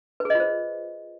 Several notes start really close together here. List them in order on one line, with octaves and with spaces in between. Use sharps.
B4 G#4 D#5 F4 C5